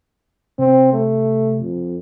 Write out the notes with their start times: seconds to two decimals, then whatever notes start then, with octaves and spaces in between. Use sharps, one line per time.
0.59 C3 C4
0.93 A3
1.60 F2